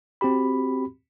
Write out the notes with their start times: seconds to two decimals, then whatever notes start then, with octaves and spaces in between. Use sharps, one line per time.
0.21 C4 F#4 G4 B5